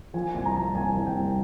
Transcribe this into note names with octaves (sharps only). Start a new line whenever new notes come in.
F3 G#5
C2 G#5
A#5
F3 A5
C2 G#5
C2
G5
C2